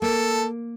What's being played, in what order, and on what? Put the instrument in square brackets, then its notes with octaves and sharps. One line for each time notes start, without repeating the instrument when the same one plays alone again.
[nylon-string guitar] A#3 [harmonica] A4